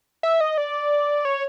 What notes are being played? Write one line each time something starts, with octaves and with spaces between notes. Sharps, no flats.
E5
D#5
D5
C#5